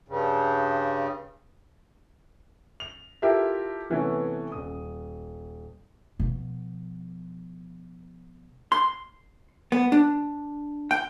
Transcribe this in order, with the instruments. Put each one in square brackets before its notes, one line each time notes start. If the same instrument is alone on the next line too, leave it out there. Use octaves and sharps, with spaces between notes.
[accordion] G2 C#3
[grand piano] F7
E4 F4 G4 A4 A#4 E5
C3 E3 A3 B3 C#4
D#1 D#6
[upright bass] B2 F3
[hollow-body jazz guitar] C6
B3
D4
G5